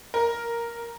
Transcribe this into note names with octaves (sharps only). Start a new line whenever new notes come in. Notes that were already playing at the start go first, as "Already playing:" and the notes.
A#4